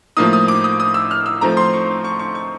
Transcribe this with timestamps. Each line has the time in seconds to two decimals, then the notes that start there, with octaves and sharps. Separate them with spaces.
0.17 A2 F3 A#3 D#4 D#6
0.33 D#6
0.48 D6
0.64 D#6
0.80 D#6
0.94 E6
1.11 F6
1.26 E6
1.41 F3 A3 C4 D#4 A#5
1.57 C6
1.73 C#6
2.04 C#6
2.19 C#6
2.35 C#6